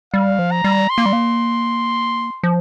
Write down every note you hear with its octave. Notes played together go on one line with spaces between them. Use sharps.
G3 F5
F3
A#5
G3
C6
A#3
G3
A#3
F3